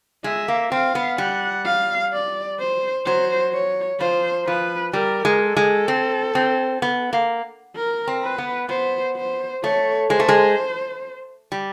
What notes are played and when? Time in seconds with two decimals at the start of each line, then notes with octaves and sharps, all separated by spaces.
0.24 G#3 E5
0.48 A#3
0.72 C4 F5
0.95 B3
1.18 G3 F#5
1.65 F5
2.13 D5
2.60 C5
3.06 F#3 C5
3.53 C#5
4.00 F3 C5
4.47 F3 B4
4.93 G3 A#4
5.25 G#3
5.41 A4
5.57 G#3
5.88 C4
6.35 C4
6.82 B3
7.13 A#3
7.76 A#4
8.07 C4
8.23 B4
8.38 B3
8.69 B3 C5
9.16 C5
9.63 A3 C#5
10.10 G#3 C5
10.20 A3
10.28 G#3
11.52 G3